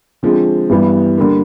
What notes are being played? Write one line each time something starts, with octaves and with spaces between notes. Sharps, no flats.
D3 F3 G#3 C4
G2 E3 G3 B3
D3 G3 A#3